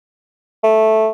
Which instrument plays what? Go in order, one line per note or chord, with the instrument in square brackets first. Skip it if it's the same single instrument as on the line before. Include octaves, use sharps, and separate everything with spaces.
[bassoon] A3